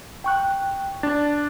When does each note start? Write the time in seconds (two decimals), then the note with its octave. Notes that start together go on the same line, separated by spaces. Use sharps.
0.24 G5 C#6 F#6
1.03 D4 A6